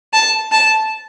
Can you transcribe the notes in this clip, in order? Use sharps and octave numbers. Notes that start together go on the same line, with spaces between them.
A5
A5